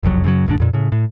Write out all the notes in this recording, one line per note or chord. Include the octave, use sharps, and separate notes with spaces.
F#1 C2 F2 F#3
F#2 C#3 F3 F#3
E1 D#2 G#2 D4
F2 A#2
A2 C#3
A2